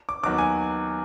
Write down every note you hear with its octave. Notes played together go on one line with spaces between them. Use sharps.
D6
D#2 D#3 F#3 B3 D6
G#5